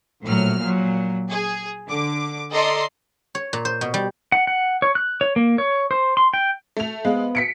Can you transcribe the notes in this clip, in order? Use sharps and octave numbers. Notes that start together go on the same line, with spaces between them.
A#1 A2 F#3 F6
A#2 F#3
G#4
D3 D6
A4 D5 D#5 A#5 C6
C#5
A#2
C5
B2
G3
F#5
F#5
C#5
F#6
C#5
A#3
C#5
C5
C6
G5
A3 F7
G#3 B3 C5 F5
B6 C#7 D7